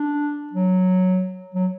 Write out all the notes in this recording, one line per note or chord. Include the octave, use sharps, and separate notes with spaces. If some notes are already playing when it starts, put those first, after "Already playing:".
Already playing: D4
F#3
F#3